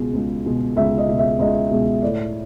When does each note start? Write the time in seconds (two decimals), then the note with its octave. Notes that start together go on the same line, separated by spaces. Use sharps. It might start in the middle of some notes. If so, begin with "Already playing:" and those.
Already playing: C#2 B2 G#3
0.14 C#2
0.46 B2 G#3
0.76 C#2 E5
0.98 D#5
1.08 B2 G#3
1.19 E5
1.39 C#2 D#5
1.71 B2 G#3
2.02 A2 D5